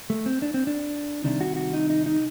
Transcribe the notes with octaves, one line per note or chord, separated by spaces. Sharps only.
A3
C4
D4
C4
D4
C2 C3 D#3 D4
F#4
F#4
D#4
D#4
D#4